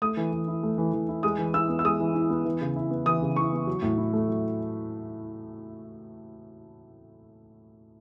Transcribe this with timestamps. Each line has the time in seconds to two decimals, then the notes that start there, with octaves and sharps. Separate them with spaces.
0.02 A3 D#6
0.17 E3
0.32 E3
0.48 E4
0.63 A3
0.78 E3
0.93 E3
1.09 E4
1.23 G#3 D#6
1.39 E3
1.54 E4 E6
1.69 B3
1.79 E6
1.84 G#3 D#6
2.00 E3
2.15 E4
2.30 B3
2.45 E3
2.61 C#3
2.76 E4
2.91 B3
3.06 E3 D#6
3.22 C#3
3.36 E4 C#6
3.52 B3
3.67 F#3
3.82 A2
3.98 E4
4.13 A3
4.28 F#3